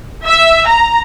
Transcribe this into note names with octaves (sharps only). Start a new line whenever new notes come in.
E5
A#5